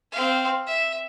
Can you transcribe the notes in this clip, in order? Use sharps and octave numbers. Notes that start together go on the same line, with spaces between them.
C4 F5
E5